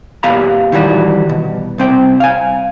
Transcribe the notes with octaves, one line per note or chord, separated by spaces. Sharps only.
A#2 B3 G4 F5 A#5 B5
D#3 E3 G3 F#4
B2
C2 C4 G5
F5 G#5